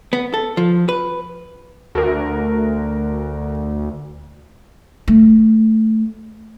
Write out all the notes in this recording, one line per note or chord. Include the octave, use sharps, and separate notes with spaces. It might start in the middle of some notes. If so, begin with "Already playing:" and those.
B3
A4
F3
B4
D2 F#4 A#4
A3